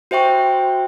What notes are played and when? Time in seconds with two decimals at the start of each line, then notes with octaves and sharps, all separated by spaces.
0.11 F#4 C5 E5 G5 C#6